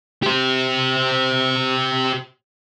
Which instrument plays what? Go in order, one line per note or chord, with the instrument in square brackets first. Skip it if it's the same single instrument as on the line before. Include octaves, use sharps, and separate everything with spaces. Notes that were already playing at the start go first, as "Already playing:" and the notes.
[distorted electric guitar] G4 C5